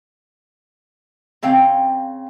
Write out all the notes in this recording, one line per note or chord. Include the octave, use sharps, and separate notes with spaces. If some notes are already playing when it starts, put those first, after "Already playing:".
C#3 C4 F5 G5